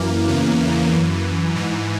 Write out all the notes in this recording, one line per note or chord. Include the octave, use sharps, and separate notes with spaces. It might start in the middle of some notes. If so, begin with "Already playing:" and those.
Already playing: F#2 E3 A#3
E2 C#3 E3
F#2 E3
G#2 E3